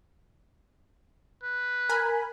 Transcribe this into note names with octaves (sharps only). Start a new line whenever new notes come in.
B4
A#4 G#5 B5